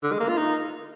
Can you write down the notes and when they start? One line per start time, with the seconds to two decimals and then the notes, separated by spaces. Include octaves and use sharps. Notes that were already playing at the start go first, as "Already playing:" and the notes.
0.03 D3
0.12 G#3
0.20 A#3
0.29 F4
0.38 D#4